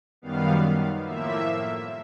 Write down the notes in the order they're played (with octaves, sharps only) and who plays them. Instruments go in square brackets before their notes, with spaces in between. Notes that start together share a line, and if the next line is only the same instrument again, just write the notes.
[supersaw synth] F#2 D#3 G3 B3 F5
A2 F3 A#3 E5